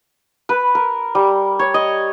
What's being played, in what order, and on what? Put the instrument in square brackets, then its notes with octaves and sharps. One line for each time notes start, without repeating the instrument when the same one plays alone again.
[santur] B4
A#4
G3
C#5
D#5